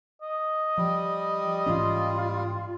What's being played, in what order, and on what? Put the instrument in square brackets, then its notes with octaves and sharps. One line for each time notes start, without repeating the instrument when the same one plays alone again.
[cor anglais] D#5
[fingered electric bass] F3 [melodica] G3
[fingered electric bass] G#2 E3 C#4 [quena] F4